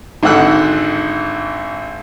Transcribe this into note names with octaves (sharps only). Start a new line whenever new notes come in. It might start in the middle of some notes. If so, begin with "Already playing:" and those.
G#1 G#2 D3 F#5 E6 F#6